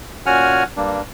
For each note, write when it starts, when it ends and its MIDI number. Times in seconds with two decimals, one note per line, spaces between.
0.26 0.63 46
0.26 0.63 61
0.26 0.63 66
0.26 0.63 78
0.26 0.63 80
0.26 0.63 89
0.76 1.02 43
0.76 1.02 55
0.76 1.02 58
0.76 1.02 62